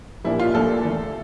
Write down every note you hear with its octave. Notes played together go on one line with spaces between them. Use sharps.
A#1 A#2 G3 A#3 D4 E4
F4
A#1 A#2 G3 A#3 D4 A4
E2 D3 A3